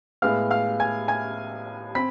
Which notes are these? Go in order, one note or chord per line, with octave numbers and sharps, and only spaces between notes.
A2 G#3 B3 F5 F6
F5 F6
G#5 G#6
G#5 G#6
C4 B5 B6